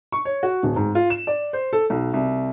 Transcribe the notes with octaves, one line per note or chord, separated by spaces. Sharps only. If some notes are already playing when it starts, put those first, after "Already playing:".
C#6
C#5
F#4
D1
G#2
F4
E7
D5
C5
A4
B1
C2